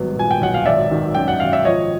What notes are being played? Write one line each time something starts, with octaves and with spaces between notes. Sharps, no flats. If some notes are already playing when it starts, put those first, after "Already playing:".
Already playing: G#1 G2 F#3 B3
A#2 G#5
G5
B1 F#5
F5
G#1 D5 E5
D#3
F#2 G5
F#5
G#1 F5
E5
F3 C#5 D#5